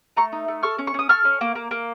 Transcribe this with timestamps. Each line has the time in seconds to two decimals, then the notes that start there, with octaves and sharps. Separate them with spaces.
0.17 A3 A#5 C#6
0.32 D#4
0.48 A3
0.63 A4 C#6 F6
0.78 C#4
0.87 C#6
0.94 C#4 D#6
1.09 A4 C#6 F6
1.25 C#4
1.41 A#3
1.55 A#3
1.71 A#3